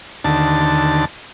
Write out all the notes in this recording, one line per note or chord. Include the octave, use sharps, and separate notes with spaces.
D#2 D3 A5